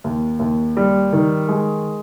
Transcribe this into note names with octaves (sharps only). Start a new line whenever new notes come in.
D#2
D#2
G3
D#3
G#3